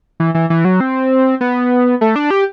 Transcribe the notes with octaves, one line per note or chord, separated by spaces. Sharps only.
E3
E3
E3
F#3
C4
B3
A3
D4
G4